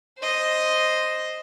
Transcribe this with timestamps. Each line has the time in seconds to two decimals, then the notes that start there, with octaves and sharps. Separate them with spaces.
0.18 C5 D#5